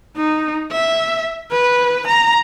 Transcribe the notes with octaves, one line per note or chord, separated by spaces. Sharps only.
D#4
E5
B4
A#5